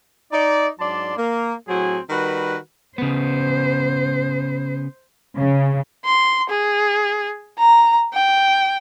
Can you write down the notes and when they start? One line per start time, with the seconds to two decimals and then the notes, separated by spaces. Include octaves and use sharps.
0.32 D#4 D5
0.79 G#2 F#3 D4 D5 A5 C6
1.17 A#3
1.68 A2 F#3 C4 F#4 G#4 G#5
2.10 D#3 G3 F#4 B4
2.98 C#3 B3 C5
5.36 C#3
6.05 C6
6.50 G#4
7.59 A#5
8.14 G5